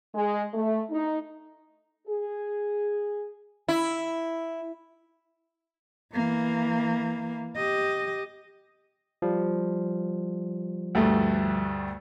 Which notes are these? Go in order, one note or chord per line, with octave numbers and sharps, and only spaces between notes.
G#3
A3
D#4
G#4
E4
E3 A#3
G4 D#5
F3 G3
D2 G2 A3